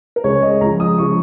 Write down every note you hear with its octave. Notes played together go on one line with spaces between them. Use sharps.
A#4
C#2 C#3 G#3 C#5
D#5
C#2 C#3 F3 A#5
D#6
C#3 F3 G#3 C#6